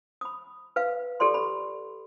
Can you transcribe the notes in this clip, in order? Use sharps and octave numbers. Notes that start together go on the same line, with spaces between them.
B5 D#6
B4 F5
G4 A4 D5 C6 C#6
B5